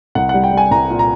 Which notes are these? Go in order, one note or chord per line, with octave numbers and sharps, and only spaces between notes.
C2 F#5
G3 F#5
G5
G3 G#5
C2 A#5
A#2
A#5